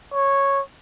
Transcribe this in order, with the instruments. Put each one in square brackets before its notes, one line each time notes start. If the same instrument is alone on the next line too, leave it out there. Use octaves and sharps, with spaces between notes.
[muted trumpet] C#5